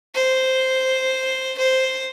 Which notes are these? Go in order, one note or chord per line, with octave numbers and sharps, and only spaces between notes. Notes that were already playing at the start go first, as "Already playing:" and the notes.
C5
C5